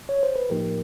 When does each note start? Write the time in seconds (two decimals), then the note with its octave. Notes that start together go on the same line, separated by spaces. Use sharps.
0.09 C#5
0.23 C5
0.36 B4
0.50 A2 F3 A#3 D#4 G4 A#4